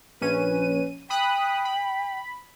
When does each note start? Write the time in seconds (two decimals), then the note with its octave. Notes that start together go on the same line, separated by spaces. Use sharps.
0.21 A#1 C#4 B4 D#7
1.10 G5 B5 D#6 F#6
1.65 B5